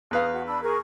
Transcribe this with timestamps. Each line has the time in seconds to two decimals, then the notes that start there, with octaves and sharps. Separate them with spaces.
0.11 E2 B4 F5 D#6
0.33 F#4 G#4 F#5
0.47 D4 B5 E6
0.62 G#4 A#4 C#6